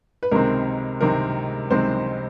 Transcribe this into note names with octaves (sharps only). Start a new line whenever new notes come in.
B4
C#2 C3 D#3 G#3 C4 A#4
C#2 C3 D#3 G#3 C4 A#4
C#2 C3 D#3 G#3 C4 C5